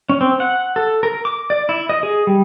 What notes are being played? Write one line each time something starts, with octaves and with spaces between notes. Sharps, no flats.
C#4
C4
F#5
A4
A#4
D6
D5
E4
D#5
G#4
G3